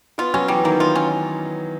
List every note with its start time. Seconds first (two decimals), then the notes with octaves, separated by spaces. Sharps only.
0.18 B3 F4
0.34 F#3 C#4
0.48 E3 G3
0.64 D#3 A#3
0.80 D#3 F4
0.95 C#4